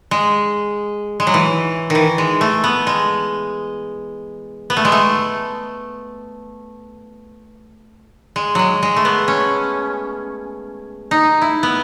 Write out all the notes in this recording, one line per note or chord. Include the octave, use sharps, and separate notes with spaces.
G#3
G#3
F#3
E3
D#3
E3
G#3
A3
B3
G#3
B3
A3
G#3
A3
G#3
F#3 G#3
G#3
A3
B3
C#4
D#4
E4
B3